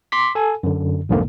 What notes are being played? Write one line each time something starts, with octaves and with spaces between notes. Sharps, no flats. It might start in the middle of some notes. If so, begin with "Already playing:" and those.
C6 D6 B6
A4 G#5
F#2 D3
B1 F2 G#2 D3 A#3